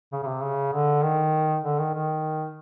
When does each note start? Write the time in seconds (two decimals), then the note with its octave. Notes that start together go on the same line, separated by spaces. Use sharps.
0.12 C#3
0.23 C#3
0.27 C3
0.42 C#3
0.73 D3
1.02 D#3
1.64 D3
1.79 D#3
1.94 D#3